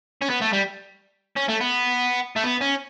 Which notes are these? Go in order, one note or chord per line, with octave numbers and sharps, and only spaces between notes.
C#4
B3
A3
G3
C#4
A3
B3
A3
B3
C#4